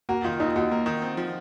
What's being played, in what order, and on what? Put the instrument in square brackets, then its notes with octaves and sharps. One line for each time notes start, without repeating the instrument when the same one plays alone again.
[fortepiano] A#3 [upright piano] F#4
[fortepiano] D#3 [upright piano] F4
[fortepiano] D#2 [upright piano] D#4
[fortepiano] D#2 [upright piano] F#4
[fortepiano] A#3
D#3
C4
F3